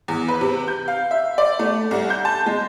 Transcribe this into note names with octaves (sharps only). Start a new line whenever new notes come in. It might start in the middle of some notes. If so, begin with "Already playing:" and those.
E2
B4
C3
G6
F5
E5
D5
A3
C2
G6
A5
G#3